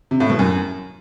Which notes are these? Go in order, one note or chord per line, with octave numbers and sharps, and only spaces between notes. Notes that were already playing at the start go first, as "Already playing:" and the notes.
C3
A2
B2
F#2